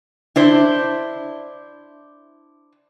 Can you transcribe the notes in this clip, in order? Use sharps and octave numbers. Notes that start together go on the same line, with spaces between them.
D4 E4 C5